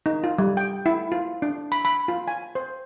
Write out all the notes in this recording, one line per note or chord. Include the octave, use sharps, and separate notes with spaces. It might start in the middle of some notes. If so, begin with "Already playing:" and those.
D#4
F4
G3
G5
E4
F4
D4
B5
B5
F4
G#5
C5